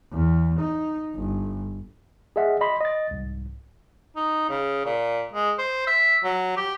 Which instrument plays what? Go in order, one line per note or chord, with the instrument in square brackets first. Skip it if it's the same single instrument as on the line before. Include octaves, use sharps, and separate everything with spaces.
[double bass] E2
D#4
G1
[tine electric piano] G#4 D#5 E5 F#5
D#5 B5 C6
D#5 A6
C2 G#2
[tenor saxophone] D#4
C#3
A#2
G#3
C5
E5
F#3
G4